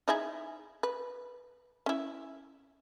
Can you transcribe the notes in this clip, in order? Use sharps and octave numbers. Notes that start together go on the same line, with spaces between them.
D#4 E4 G#4
B4
C#4 E4